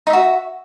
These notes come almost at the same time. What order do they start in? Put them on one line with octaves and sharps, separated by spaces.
D#4 E5 F#4